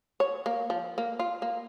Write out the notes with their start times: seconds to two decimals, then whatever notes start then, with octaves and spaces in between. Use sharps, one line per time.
0.20 C#5
0.46 A#3
0.70 F3
0.98 A#3
1.19 F4
1.42 A#3